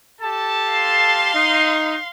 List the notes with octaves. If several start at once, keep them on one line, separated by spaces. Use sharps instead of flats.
G4 A4 A5
F5 C6
D#4